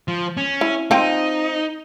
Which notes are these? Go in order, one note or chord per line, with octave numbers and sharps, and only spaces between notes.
F3
C#4
E4
F3 C4 D#4 G5